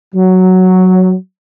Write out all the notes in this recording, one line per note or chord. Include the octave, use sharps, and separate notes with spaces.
F#3